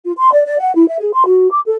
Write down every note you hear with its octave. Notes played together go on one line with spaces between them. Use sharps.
F4
C6
D5
D5
F#5
E4
E5
G#4
C6
F#4
D6
A4